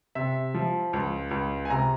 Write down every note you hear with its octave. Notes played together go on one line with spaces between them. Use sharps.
C3 E5
F3
C#2
C#2
G#5
C3 A#5